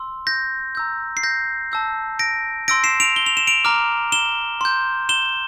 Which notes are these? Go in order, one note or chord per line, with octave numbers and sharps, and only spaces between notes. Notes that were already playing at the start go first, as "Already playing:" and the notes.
Already playing: C6 E6
G6 A#6
A#5 E6 G6
C7
G6 A#6
A5 E6 G6
A#6 D7
C6 E6 G6 A#6 D7
C7 E7
D7 F7
G7
F7
E7
D7 F7
A#5 D6 F6
E7 G7
C6 G6
E7 G7